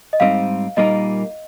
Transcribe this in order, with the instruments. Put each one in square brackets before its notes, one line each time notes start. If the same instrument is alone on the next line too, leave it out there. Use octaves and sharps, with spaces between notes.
[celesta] D#5
[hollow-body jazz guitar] G#2 G3 C4 D#4 [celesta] F5
[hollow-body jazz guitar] A#2 G3 A#3 D#4 A#4 [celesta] D#5